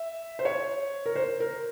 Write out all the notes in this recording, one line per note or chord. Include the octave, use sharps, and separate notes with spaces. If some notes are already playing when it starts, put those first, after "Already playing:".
Already playing: E5
C5
C#5
A#4
C5
A#4